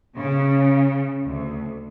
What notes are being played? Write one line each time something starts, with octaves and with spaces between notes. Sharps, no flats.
C#3
D2